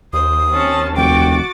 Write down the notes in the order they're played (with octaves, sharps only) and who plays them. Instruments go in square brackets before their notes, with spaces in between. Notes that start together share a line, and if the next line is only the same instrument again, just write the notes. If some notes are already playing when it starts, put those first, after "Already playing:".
[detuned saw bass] D#2 [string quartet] C5 [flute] D#6
[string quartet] C4 C#4 A5
[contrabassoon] F1 [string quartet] F#4 D6 A6 [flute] G5